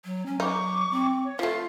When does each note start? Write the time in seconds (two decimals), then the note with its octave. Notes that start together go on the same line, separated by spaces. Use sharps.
0.05 F#3
0.26 C#4
0.40 F#3 D#4 C#6 D6
0.91 C4
1.25 C#5
1.39 F3 A3 F4 F5